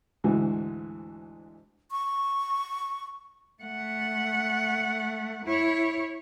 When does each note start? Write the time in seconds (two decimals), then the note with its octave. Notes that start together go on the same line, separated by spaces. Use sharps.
0.24 D2 G#2 E3 F#4
1.91 C#6
3.63 A3 F#5
5.45 E4 C#5